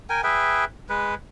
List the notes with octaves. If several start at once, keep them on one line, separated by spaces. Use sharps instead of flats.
A#4 G5 G#5
G#4 B4 E5 G5
G#3 B4